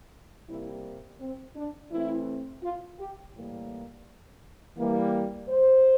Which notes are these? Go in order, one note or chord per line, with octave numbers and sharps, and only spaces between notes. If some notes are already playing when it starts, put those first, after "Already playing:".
C3 G3 A#3 E4
C4
D4
E3 A3 C4 E4
F4
G4
A2 E3 G3 A#3
E3 G3 A#3
C5